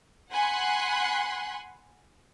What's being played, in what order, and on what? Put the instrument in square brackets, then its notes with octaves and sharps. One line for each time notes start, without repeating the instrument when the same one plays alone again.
[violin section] F#5 G#5 B5 C6 F#6